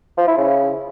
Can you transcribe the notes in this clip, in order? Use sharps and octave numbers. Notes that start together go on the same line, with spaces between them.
F3
E4
C#3